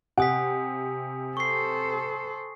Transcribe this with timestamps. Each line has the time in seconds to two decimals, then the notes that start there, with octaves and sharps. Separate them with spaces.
0.18 C3 F#5 G#5 D#6 B6
1.37 A4 C5 C#6 C7